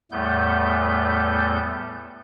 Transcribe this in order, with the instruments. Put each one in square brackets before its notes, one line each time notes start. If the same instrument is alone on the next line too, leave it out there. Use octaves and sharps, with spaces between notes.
[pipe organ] E2 A2 G3 A3 B3 G6